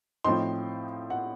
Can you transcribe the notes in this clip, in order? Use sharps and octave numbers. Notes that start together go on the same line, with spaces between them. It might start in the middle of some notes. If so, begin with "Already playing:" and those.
A2 F3 C4 D#4 C6
F#5